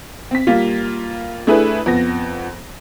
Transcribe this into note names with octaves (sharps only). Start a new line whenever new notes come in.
C4 B6
G3 A#3 F4
A3 D4 E4 G#4 A4 B4
F2 B3 A#6